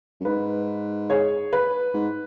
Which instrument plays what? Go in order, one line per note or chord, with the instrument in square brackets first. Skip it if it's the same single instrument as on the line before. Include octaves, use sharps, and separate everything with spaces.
[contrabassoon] F#2
[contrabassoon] G#2 [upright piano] B4
[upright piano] G#4 C#5
B4
[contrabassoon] G#2